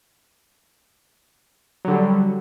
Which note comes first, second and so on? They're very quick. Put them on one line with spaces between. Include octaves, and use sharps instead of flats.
F#3 D3 G3